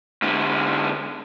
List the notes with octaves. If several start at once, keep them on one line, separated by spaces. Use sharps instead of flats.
G#2 D3